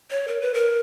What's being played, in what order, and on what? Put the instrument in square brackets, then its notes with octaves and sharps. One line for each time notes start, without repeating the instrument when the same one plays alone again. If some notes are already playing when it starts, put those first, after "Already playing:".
[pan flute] C#5
A#4
B4
A#4